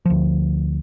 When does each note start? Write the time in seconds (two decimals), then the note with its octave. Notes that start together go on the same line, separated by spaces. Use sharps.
0.06 D2 F3